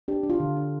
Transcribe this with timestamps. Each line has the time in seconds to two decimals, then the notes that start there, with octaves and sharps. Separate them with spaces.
0.08 D4 G4
0.23 D4
0.30 F4
0.40 D3
0.57 D4